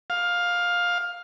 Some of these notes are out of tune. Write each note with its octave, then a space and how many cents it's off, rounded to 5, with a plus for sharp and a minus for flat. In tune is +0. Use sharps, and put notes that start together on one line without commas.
F5 +15